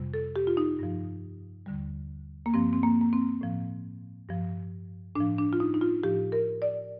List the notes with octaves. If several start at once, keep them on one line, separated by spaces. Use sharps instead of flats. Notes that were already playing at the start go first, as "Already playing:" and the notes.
Already playing: F2 C3 G3
A4
G4
F4
D#4
G2 F3
D#2 D3 G3
A#3
G2 F3 C4
C4
A#3
A#3
C4
A2 F3
G2 F3
A2 F3 D4
D4
F4
D#4
D#4
F4
A2 F3 G4
A#4
D5